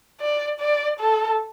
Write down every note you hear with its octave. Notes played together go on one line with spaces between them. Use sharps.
D5
D5
A4